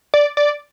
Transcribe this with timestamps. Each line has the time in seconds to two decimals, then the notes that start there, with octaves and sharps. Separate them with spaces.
0.14 D5
0.37 D5